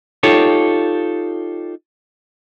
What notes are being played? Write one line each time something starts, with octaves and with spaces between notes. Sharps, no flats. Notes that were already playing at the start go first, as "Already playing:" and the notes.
D#4 F4 G4 A4 C#5